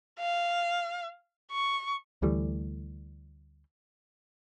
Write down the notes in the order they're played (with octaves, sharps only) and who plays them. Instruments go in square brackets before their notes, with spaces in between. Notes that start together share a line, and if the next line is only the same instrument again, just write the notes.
[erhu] F5
C#6
[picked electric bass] D2 E3 G3 A3